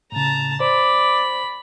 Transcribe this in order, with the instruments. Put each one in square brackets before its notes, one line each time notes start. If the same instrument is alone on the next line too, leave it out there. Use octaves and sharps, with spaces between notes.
[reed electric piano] A2 C#3 [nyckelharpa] A5 A#5
[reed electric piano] C5 [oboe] D5 [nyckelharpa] B5